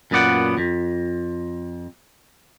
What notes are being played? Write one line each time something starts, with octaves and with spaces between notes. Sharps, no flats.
F#2 A#2 B3 D5 F#5
F2